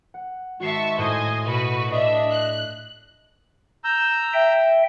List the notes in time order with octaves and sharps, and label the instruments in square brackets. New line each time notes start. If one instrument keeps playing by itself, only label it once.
[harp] F#5
[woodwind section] G#2 D#3 G#3 [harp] F#4 C7 [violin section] E5 A5 C#6
[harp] A2 [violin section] C5 D#5 G#5
[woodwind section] B2 [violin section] F#4 B4
[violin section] D4 E5 [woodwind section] D#5
[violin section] F#6
[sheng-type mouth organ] A#5 E6 G6
[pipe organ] E5 G5